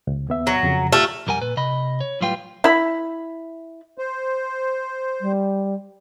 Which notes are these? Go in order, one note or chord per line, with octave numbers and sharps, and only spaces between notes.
C#2
D#2 B3 E5
F#3
F2 C#3
A3 F4 G4 F6
B1 F2 G3 A#4 F#5 G#5
A#2 B4
C3 D#5 B5
C#5
A2 F#3 G3 F4 B4 G5
E4 B5
C5
G3